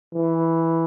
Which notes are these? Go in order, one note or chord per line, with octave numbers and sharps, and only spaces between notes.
E3